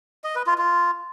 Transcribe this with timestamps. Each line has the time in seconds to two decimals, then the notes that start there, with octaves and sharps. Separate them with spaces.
0.24 D#5
0.35 B4
0.47 F4
0.58 F4